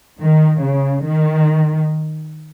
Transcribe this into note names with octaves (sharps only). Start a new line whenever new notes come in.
D#3
C#3
D#3